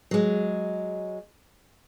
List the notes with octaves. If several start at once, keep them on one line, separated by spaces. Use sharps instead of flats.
F#3 G#3